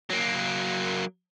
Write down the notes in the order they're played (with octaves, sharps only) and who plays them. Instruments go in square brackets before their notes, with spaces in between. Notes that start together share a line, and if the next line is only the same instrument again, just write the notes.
[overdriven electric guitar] F#3 A#3